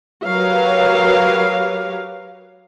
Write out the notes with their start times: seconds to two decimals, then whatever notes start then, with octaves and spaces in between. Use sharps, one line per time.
0.26 F#3 G4 A#4 B4 C#5 F5